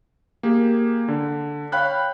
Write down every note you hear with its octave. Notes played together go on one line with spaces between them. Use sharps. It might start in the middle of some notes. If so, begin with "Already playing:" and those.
A#3 G4 G#4
D3
C#5 F5 G5 B5 F#6 G6